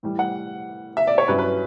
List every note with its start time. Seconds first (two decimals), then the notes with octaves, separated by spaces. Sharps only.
0.03 A2 E3 G3
0.19 F#5
0.97 E5
1.07 D5
1.18 C#5
1.28 G2 F#3 C#4 E4 B4
1.38 B4